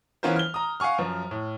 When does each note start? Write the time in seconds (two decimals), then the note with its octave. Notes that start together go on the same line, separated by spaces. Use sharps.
0.23 E3 B3 C#4 F4 A#4 C5
0.36 F6 G7
0.54 A#5 D#6
0.80 F5 F#5 G#5 C#6 F6
0.98 F#2 F3
1.31 A2